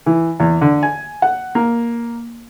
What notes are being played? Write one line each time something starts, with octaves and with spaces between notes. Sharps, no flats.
E3
E2
D3
G#5
F#5
A#3